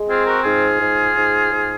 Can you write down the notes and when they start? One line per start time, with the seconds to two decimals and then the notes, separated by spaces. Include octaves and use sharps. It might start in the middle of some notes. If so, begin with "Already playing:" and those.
Already playing: G#3
0.08 C4 F4 G#4
0.27 F#4 A#4
0.44 G#2 F4 G#4
0.80 G#2
1.16 G#2
1.51 G#2